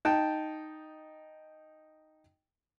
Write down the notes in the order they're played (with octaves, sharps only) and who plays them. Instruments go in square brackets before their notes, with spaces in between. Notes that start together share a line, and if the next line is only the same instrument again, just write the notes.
[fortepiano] D#4 G5 A5